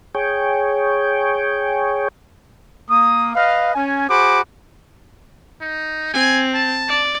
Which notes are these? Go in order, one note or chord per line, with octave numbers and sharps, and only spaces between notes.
G#4 C#5 G5
A#3 D#6
B4 D#5 F5
C#4 G#5
F#4 G#4 C5 B5 D6
D#4
C4 G#5
A5
D5